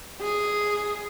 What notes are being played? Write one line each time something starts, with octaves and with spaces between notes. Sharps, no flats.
G#4